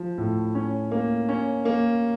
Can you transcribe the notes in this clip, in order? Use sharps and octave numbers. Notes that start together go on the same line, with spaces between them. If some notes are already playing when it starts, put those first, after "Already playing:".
Already playing: F3
A2
C#4
A#3
C#4
A#3